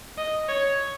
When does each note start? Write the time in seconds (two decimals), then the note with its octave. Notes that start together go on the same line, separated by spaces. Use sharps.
0.18 D#5
0.49 C#5